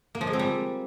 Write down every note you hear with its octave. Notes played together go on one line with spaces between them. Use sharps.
A#3
F3
G#3
C4
G3